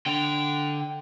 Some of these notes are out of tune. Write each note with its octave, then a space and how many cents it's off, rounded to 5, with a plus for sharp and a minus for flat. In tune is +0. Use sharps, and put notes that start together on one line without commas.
D3 +0 G5 -10